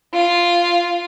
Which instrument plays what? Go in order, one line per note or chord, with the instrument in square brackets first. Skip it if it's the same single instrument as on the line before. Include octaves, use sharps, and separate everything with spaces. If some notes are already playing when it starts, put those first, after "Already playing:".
[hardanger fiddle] F4